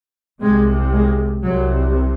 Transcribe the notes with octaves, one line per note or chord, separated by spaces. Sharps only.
C2 C3 G#3
G#3
C2 C3 F#3